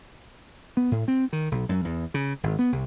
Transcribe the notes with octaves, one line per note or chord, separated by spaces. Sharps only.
B3
A2
C4
D#3
B1
F#2
E2
C#3
G#1
B3
C2